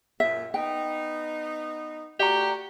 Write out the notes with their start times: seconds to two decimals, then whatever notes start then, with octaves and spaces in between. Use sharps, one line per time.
0.20 F#2 A#2 E5
0.54 B3 D#4 G5
2.20 A3 F#4 G4 D5 A#5